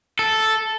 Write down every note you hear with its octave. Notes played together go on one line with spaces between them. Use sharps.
A4